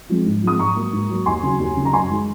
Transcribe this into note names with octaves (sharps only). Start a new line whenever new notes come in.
F3 G#3 C4
G#2
F3 G#3 C4 D#6
G#2 A#5 C#6
F#3 A#3
G#2
F#3 A#3
D#2 G#5 C6
C#3 F#3
D#2
C#3 F#3
A#5
F#2 G#5 C6
D#3 G#3